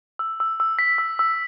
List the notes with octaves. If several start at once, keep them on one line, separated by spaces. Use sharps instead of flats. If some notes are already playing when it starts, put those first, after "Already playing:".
E6
E6
E6
B6
E6
E6